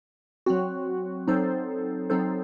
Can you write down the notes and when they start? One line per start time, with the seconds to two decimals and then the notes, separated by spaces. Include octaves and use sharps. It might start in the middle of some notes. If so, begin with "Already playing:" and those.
0.46 F#3 C4 F#4
1.28 F#3 C4 D#4 A4 C5
2.10 F#3 C4 D#4 A4 C5